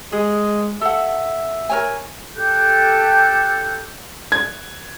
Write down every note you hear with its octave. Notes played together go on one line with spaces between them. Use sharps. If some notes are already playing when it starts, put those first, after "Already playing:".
G#3 G#4
A4 E5 F#5
A#4 C#5 G#5
G4 A4 F#6 G6
G#6